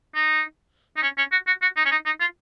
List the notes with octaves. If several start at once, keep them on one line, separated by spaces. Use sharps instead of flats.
D#4
D#4
C#4
C#4
F#4
F#4
F#4
D#4
C#4
D#4
D#4
F4